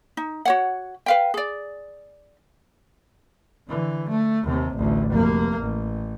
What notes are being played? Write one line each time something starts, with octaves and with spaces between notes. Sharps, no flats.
D#4
F#4 C#5 F#5
B4 F5 G5
G#4 D5
D3 E3
A3
D#2 C3
A1 D2
F1 A#3
A1